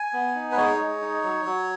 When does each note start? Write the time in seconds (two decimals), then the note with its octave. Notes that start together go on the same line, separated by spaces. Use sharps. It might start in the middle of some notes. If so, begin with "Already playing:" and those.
Already playing: G#5
0.13 B3
0.35 D#4
0.52 B4
0.57 G#3 C#5
0.79 G#3
1.01 D#4
1.24 F#3
1.45 F#3